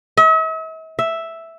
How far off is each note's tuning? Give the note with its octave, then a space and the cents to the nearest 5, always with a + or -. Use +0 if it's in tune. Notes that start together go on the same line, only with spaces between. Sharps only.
E5 -45
E5 +0